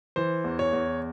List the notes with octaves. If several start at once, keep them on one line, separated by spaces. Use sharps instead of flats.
E3 C5
E2
C#5
E2